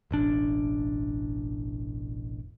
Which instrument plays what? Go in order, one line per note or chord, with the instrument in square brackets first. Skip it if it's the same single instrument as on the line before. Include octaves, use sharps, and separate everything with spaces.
[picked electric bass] E1 A1 D4